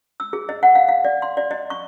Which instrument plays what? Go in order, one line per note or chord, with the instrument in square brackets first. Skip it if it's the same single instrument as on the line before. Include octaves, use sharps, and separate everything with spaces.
[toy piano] E6
G#4
D#5
F#5
F5
F5
D5
C6
D5
D#5
C#6